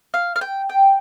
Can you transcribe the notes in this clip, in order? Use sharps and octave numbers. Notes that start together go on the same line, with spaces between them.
F5
F5
G5
G5